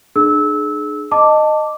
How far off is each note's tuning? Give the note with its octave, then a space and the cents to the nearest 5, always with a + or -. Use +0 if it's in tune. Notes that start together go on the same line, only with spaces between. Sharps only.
D4 +35 G#4 +30 E6 -20
D#5 -15 A5 +15 D6 -5